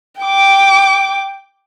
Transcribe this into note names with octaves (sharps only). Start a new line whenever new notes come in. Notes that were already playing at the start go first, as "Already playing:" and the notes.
G5 D6